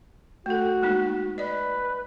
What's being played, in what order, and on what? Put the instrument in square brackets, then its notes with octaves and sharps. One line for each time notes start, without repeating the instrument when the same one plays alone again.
[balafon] A3 A4 [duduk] F#4
[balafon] G#3 A#3 D#4
[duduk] B4 [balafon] D5 D#5